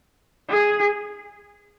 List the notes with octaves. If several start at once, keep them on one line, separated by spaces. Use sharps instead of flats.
G#4